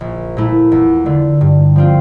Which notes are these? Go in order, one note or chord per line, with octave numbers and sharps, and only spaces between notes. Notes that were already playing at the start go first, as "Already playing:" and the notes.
A#1
A#2 A3 E4
E2
D3 A3
G2
F3 C4 F4